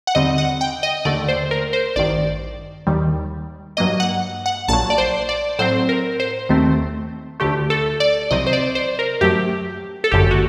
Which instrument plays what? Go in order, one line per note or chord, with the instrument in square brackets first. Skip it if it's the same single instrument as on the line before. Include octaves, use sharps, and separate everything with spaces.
[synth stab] F#5
D#2 D3 G3 C4 D#5
F#5
G5
D#5
D#2 D3 A3 D5
C5
A#4
C5
A1 G2 D#3 D5
D#2 D#3 G3
G2 F#3 A#3 D#5
F#5
F#5
A#1 A#2 F#3 A5
D5
C5
D5
A2 F#3 C4 C5
A#4
C5
D#2 D#3 A3 C4
D2 D3 A3 G4
A4
D5
C2 C3 F#3 C4 D#5
C5
D5
C5
A#4
F#2 F#3 A3 G4
A4
G1 F#2 D3 A3 G4
F#4